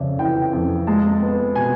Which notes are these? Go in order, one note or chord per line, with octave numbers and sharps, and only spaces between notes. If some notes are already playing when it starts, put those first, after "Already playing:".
Already playing: F2 C#3 D5 E5
E3 G5
F2
G#3 A5
B3
B2 G#5